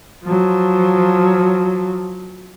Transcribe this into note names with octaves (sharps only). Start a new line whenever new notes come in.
F3 F#3